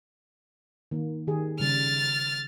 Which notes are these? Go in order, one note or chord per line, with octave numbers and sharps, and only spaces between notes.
D#3 A#3
D#3 G4 G#4
C#3 G3 F6 A6